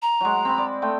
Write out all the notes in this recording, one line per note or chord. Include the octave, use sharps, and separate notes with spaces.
A#5
F#3 G#3
C4 B5
D5
A3 G5